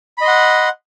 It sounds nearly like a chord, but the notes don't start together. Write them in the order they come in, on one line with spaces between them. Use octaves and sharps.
B5 D#5 C6 F#5